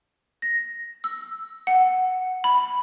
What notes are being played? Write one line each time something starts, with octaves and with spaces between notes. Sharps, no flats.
A#6
E6
F#5
B5